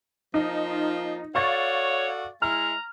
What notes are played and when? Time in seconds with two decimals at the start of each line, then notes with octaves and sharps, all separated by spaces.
0.34 F3 A#3 D#4 F4
1.35 F#4 A4 C#5 D5 F5 C#6 A6
2.42 G#3 E4 A#5 F6